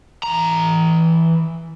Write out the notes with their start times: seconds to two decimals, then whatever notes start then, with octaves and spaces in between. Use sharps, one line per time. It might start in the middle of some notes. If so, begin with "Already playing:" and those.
0.23 E3 A#5